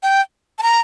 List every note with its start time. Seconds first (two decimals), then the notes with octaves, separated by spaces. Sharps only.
0.03 G5
0.59 A5
0.63 A#5